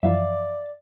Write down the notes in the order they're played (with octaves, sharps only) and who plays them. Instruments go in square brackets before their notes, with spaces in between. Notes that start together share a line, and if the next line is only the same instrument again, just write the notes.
[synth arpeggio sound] F#2 E3 F3 [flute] D5 [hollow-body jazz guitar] E5 F5